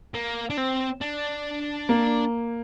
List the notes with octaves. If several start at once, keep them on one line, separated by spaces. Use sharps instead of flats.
A#3
D4
C4
D4
A#3